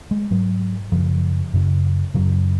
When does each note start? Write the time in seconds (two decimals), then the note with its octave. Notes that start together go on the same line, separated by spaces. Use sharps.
0.11 G#3
0.31 G#2 F#3
0.92 F#2 C#3 F3
1.53 F#2 C#3
2.14 F#2 C#3 F#3